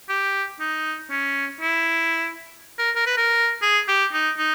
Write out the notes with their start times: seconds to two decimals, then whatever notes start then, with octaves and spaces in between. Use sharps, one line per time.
0.09 G4
0.60 D#4
1.11 C#4
1.61 E4
2.79 A#4
2.96 A#4
3.07 B4
3.18 A#4
3.63 G#4
3.88 G4
4.13 D#4
4.38 D#4